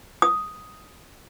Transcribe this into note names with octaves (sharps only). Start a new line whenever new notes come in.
D#6